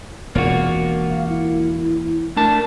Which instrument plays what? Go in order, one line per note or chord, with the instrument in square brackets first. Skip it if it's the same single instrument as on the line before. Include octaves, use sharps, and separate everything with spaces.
[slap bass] E1 [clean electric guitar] A#3 F4 F#4
[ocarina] F5
E4
[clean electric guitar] A3 D4 A5 [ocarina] A#4